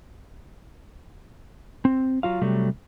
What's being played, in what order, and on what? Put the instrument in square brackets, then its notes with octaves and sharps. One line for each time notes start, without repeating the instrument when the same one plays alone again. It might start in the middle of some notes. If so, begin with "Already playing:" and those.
[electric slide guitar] C4
F#3 F4 F5
C3 F#3 G3 A3